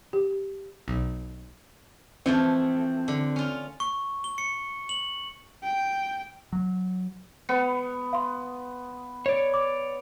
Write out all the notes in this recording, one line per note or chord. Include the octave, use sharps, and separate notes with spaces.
G4
B1
E3 F3 A3 C4
D3
C#4 F4
C#6
G7
C#7
F#7
G5
F#3
B3 C#7
F5 C6
C#5 D5
D6